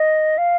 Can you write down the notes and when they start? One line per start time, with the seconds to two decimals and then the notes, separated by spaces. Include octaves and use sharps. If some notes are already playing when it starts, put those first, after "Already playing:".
Already playing: D#5
0.38 F5